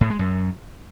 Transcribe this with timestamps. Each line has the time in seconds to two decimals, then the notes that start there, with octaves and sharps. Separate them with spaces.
0.01 A2
0.10 G#3
0.19 F#2